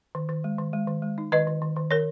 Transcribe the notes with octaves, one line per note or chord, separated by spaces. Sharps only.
D#3
D#3
G#3
D#3
G#3
D#3
G#3
D#4
D#3 B4 D#5
D#3
D#3
D#3
D#3 A#4 C#5